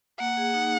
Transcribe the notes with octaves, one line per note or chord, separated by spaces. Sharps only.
A#3 F#5
G#4
D#4